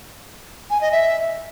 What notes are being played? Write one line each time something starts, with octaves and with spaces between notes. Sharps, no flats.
G#5
D#5
E5